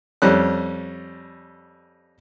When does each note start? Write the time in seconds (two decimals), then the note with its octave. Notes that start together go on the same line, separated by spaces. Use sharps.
0.22 F2 G3 C#4 F#6